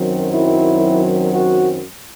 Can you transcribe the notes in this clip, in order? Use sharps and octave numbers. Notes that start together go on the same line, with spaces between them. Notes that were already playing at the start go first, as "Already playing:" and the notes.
Already playing: F#2 D#3 F#3 C4
E4
F#4